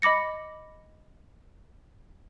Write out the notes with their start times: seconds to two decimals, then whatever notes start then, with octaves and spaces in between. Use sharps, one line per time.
0.02 D#5 B5 D6 A#6 C#7